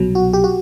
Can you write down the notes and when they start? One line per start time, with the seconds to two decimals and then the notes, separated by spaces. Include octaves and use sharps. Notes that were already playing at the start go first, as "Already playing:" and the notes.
Already playing: C2 B2 F#3
0.15 F#4
0.33 G4
0.44 F#4